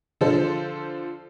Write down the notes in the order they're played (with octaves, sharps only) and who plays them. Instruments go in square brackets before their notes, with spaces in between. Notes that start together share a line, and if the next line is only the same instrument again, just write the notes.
[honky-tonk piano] D3 F3 A4 C5